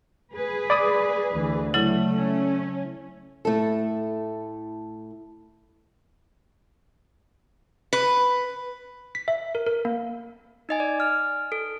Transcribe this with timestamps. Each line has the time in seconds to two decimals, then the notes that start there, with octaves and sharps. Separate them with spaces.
0.34 G#4 B4
0.70 D5 B5 D#6
1.33 D2 D3 E3
1.74 C#3 F#3 A3 E4
2.14 C#4
3.45 A2 A3 E4 A4
7.93 B4
9.15 B6
9.28 E5
9.55 A#4
9.66 A#4
9.85 A#3
10.69 D#4 D#5 G#5
10.80 D5
11.00 F6
11.52 A4